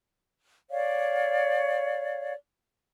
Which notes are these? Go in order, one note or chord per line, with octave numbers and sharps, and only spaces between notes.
C#5 D5 F5